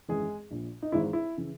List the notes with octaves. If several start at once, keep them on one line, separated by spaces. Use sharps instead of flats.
G#1 F#2 E3 G#3 G#4
A#1 A#2
D#4
G#1 G#2 E3 E4
E4
C#3 E3